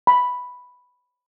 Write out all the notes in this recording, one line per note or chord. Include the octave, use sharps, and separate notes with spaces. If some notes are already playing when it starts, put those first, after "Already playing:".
B5